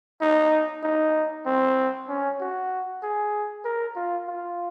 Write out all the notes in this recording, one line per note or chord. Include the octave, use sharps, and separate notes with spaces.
D#4
D#4
C4
C#4
F#4
G#4
A#4
F4
F4